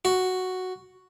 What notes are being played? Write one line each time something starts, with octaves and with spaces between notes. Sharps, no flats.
F#4